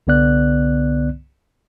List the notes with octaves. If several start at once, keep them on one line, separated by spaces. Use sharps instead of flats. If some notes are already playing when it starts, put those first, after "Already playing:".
C2 D3 B3 D5 F#6